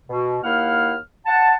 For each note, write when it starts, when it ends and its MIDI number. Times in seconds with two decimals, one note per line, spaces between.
0.08 0.38 47
0.43 0.95 39
0.43 0.95 58
0.43 0.95 64
0.43 0.95 77
0.43 0.95 78
0.43 0.95 89
1.26 1.53 78
1.26 1.53 81